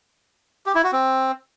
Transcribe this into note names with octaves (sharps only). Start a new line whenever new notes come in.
G4
E4
F#4
C4